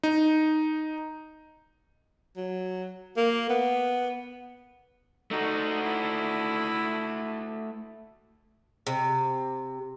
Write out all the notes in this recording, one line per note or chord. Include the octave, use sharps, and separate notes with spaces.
D#4
F#3
A#3
B3
A3 D#4 F#4
E4
C3